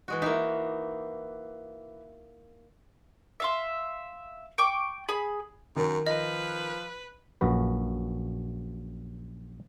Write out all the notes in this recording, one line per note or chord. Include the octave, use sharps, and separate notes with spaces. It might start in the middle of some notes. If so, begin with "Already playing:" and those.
E3 G#3 F#4
E3 A#3 D#4
E5 F5 C6
G5 C#6 D6
G#4 B5
F#2 D#3
F3 B4 D#5
A#1 F#2 F#4 B4